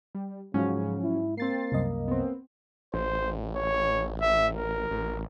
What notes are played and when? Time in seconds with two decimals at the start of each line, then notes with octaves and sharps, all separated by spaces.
0.15 G3
0.54 G#2 C#3 F3 F#3 C#4
1.03 E4
1.38 A#3 C4 A6 C7
1.72 C2 F#2 D#5
2.08 B3 C4
2.94 A1 C5
3.55 C#5
4.21 E5
4.55 A#4
4.91 A1